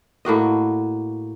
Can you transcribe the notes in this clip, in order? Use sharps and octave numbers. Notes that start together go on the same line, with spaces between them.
A2 A#3 F#4 D#5